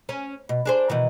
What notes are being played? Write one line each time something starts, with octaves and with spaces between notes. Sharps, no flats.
C#4
B2
D4 G#4 C5
B2 D#3 E3